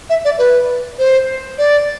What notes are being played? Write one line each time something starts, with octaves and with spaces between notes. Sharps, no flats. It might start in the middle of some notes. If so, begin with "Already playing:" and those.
E5
D5
B4
C5
D5